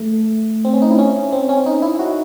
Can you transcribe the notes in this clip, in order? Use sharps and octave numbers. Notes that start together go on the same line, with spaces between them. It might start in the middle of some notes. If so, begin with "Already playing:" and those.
Already playing: A3
C4
C#4
D#4
E4
C#4
C4
C#4
D#4
E4
F#4